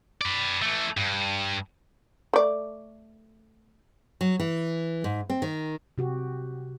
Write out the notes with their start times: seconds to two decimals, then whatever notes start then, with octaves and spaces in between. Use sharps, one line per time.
0.21 B4 D5
0.62 E3 A3
0.97 G2
2.33 A3 D5
4.21 F#3
4.40 E3
5.04 G#2
5.30 C4
5.42 D#3
5.98 C3 F#4 G4